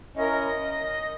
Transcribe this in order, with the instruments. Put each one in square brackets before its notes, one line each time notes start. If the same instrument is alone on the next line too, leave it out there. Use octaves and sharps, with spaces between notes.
[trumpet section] C#4 E4 A#4 [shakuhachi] D#5